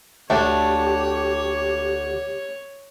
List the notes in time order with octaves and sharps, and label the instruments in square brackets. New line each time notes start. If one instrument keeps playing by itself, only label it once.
[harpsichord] D2 [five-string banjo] A3 D4 [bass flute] G4 [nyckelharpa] C#5